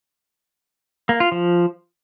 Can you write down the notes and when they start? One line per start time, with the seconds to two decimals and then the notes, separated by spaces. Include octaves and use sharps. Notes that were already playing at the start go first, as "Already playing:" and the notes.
1.09 A#3
1.20 F4
1.32 F3